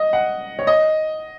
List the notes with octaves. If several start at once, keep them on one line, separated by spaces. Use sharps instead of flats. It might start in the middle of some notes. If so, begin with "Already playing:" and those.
Already playing: D#5
F#5
C#5
D#5